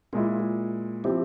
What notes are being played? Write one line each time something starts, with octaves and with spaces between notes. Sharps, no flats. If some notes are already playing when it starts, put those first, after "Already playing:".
A#2 G#3 E4 F4
F3 C4 E4 G4